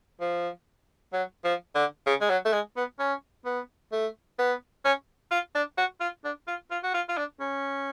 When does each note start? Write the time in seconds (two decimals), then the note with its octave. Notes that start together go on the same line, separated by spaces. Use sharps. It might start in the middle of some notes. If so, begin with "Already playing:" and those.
0.21 F3
1.13 F#3
1.45 F3
1.75 D3
2.07 C#3
2.21 G#3
2.30 F#3
2.46 A3
2.53 G#3
2.77 B3
2.99 C#4
3.46 B3
3.92 A3
4.39 B3
4.85 C#4
5.31 F4
5.55 D4
5.78 F#4
6.01 F4
6.24 D4
6.48 F4
6.71 F4
6.83 F#4
6.94 F4
7.09 F4
7.17 D4
7.40 C#4